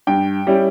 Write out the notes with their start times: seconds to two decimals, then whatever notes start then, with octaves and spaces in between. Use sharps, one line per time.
0.07 G2 G5
0.47 G3 C#4 E4